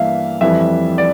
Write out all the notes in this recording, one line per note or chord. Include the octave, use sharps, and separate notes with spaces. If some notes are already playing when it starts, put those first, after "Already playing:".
Already playing: G2 E3 A#3 E5 F5
F2 E3 G3 E5
D5